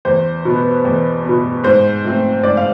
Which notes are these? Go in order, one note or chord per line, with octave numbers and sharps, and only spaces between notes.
E2 C5
B2 B3
E2
B2 B3
G#2 C5
F3 A3 C4
G#2 D5
F5